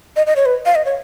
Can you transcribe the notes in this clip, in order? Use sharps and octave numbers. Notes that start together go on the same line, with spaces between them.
D#5
D#5
C#5
B4
F5
D#5
C#5